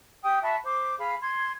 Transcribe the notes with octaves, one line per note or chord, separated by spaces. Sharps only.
G4 G5 D#6
F#4 E5 A5 B5
C5 D6
G#4 F5 B5
C6 G#6